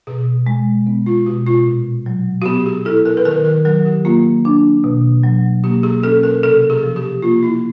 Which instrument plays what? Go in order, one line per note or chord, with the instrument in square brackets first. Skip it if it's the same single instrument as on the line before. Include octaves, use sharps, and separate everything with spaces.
[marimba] B2 [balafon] G#4
[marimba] G#3
B3
[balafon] F4
[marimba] B2 [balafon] F#4
[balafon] F4
[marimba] A#2
F#3
[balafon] F#4
[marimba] B3 [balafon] G4
[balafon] G#4
[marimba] E4 [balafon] A4
[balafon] A#4
B4
[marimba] D#3 [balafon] A#4
[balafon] A#4
[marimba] F#3 [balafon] A#4
[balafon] G4
[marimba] A#3 [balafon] F4
[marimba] D4
B2
F#3
[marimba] A#3 [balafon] G4
[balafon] G#4
[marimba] C#4 [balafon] A4
[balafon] A#4
[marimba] C3 [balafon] A4
[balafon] G#4
[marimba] F3
[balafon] G4
[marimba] A#3 [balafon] F4
[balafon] E4